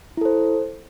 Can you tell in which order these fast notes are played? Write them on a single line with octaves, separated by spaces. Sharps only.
E4 A4 C5